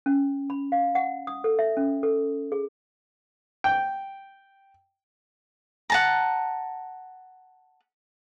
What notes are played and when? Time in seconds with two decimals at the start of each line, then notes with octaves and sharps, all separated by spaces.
0.06 C#4
0.50 B5
0.72 F5
0.95 F#5
1.27 D#6
1.44 A4
1.59 E5
1.77 C#4
2.03 A4
2.52 G#4
3.64 G5
5.90 F#5 A5 A#5